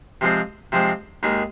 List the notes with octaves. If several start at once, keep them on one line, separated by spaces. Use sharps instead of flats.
C3 F3 G#3 C4
C3 F3 G#3 C4
D#2 D#3 G#3